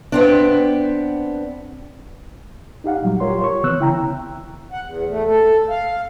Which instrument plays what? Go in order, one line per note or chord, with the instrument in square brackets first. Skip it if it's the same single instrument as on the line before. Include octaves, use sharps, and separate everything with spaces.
[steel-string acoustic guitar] B3 C4 D4
[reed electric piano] D#4 G4 F5 F#5
A#2 F#3 G3
F4 G4 A#4 C#5 C6
C#5 C#6
C3 E3 B3 E6 F#6
C#3 E4 G5 A#5
[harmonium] F#5
E2
A3
A4
F5